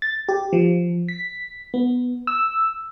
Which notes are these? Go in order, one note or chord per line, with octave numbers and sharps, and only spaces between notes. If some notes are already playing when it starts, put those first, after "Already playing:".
A6
G4
F3
B6
B3
E6